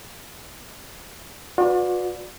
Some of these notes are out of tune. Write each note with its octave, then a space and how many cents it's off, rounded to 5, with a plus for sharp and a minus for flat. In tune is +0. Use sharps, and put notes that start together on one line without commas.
F#4 -40 B4 +0 D5 +0